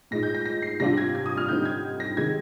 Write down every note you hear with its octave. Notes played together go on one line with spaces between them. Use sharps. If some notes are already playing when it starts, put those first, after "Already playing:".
A#2 G#3 D#4 A#6
G6
A#6
A#6
C7
C3 G3 D4 F4 A#6
G#6
G#6
D#6
F6
D3 G3 C4 D#4 G6
G#6
A#6
C3 D#3 G#3 G#6